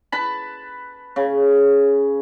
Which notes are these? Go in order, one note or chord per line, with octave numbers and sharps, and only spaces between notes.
B4 A5 B5
C#3